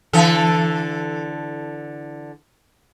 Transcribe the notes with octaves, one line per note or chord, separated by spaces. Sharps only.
D3 E3 A4